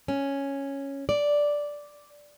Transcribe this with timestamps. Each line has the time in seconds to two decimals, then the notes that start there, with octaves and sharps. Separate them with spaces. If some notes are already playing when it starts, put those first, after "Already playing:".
0.08 C#4
1.09 D5